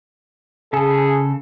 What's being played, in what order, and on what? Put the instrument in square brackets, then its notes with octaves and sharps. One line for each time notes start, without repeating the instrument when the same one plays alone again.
[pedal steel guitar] C#3 A4 [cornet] G#4